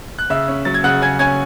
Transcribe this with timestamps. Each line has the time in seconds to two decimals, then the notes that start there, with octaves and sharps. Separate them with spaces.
0.19 F#6
0.30 C#3 E5 E6
0.48 C#4
0.65 F#3 A6
0.74 G#6
0.84 C#3 F#5 F#6
1.02 C#3 G#5 G#6
1.19 C#4 G#5 G#6